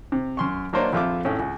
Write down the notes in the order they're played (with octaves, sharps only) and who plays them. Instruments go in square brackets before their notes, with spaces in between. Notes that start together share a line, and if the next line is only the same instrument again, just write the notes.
[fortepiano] C3
F#2 C6 C#6
F#3 A#3 D4 C5 C#5 D#5
A#1 F2 F4 A4 E5 D6
G#1 A2 C#4
C#2